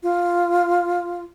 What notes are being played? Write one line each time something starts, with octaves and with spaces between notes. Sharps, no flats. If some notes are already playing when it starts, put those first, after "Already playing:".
F4